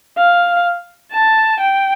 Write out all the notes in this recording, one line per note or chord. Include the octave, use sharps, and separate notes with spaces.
F5
A5
G5